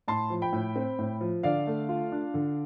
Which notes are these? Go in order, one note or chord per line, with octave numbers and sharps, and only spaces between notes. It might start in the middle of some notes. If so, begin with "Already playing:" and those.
A2 A5 C6
F3
G5 B5
A2
C4
A2
F3
D3 D5 F5
A3
F4
D4
D3